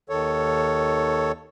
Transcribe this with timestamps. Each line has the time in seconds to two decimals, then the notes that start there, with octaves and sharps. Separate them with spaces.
0.09 D#2 D#3 A4 C#5